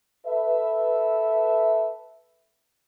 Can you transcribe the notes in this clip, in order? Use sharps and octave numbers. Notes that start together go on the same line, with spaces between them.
A4 B4 E5